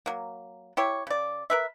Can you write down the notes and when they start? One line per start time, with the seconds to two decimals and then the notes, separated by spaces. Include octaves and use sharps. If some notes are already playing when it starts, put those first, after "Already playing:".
0.06 F#3 A#3
0.77 E4 G4 C#5
1.07 C#3 D5
1.50 A#4 B4 E5